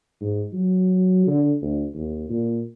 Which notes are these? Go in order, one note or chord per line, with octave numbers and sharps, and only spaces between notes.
G#2
F#3
D3
D2
D#2
A#2